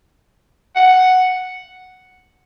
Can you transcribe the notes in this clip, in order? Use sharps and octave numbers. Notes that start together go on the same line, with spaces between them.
F#5